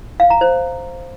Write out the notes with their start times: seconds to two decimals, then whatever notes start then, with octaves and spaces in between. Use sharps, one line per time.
0.20 F5
0.30 A#5
0.41 C5